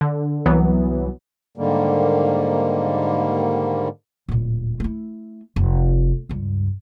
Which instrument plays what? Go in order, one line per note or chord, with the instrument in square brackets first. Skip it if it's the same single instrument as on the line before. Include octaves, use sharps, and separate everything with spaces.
[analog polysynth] D3
C2 E3 F#3 B3
[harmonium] G#2 D3 D#3 G3 A#3
[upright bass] D1 A#2
A3 E4
F1
C#2 G2